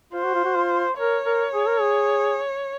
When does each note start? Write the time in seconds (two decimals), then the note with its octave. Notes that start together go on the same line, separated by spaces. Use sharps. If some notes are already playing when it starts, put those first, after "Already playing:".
0.13 F4 C5
0.24 F#4
0.34 F4
0.45 F#4
0.55 F4
0.98 A#4 C#5
1.26 A#4
1.53 G#4
1.67 A#4
1.81 G#4